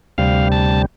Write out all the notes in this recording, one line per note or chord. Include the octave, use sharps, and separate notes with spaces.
D2 C3 G3 F5
A5